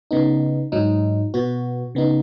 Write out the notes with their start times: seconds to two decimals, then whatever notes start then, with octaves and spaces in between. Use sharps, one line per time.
0.11 C#3 B3 D#4
0.72 G#2 F#3 D#4
1.34 B2 B3 F#4
1.95 C#3 B3 D#4